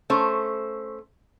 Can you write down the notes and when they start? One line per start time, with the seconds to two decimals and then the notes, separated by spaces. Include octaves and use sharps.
0.10 A3 C#4 C5